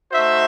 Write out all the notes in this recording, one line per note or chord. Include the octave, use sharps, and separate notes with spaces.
A3 D#4 F#4 C5 E5